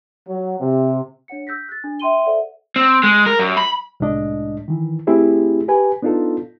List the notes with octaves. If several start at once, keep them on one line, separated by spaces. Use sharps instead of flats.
F#3
C3
D4 C#5 F#5 C#7
E6 G6 A#6 B6
F#6 A6
D4
E5 G5 C6 D#7 G7
A4 C5 D5 E5 F#5
C4
G#3
A#4
F#2
B5
C2 A2 G#3 D4 D#5
D#3 E3
A3 C4 E4 G4 G#4
G4 B4 G#5
B3 D4 D#4 F4 A4